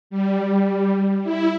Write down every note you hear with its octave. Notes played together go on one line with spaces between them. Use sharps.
G3
E4